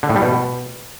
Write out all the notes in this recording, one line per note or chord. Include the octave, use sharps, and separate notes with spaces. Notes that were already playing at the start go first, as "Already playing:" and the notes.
D3
A2
G3
B2